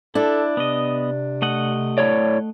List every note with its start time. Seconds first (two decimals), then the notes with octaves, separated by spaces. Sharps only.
0.15 D4 E4 A4
0.57 C3 B3 D#5
1.42 A3 D#5 F#5
1.98 A2 C#5 D5